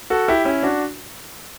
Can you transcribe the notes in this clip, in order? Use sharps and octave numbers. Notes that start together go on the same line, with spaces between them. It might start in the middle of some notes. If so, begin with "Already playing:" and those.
F#4 A4
E4 G4
C#4 E4
D4 F#4